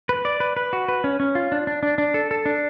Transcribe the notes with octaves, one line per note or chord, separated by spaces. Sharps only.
B4
D5
B4
B4
F#4
B4
C#4
C#4
F4
D4
D4
D4
D4
A4
A4
D4